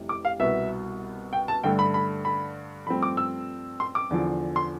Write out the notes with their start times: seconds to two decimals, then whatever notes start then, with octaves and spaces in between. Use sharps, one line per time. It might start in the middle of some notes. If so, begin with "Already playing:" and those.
Already playing: F1 C3 E3 G3
0.09 D6
0.25 F5
0.39 C2 B2 B3 E5
1.33 G5
1.48 A5
1.63 G2 D3 A3 G5
1.79 B5
1.94 B5
2.25 B5
2.87 G2 F3 A3 C4 B5
3.03 D6
3.17 E6
3.80 C6
3.95 D6
4.11 E2 D3 F3
4.56 C6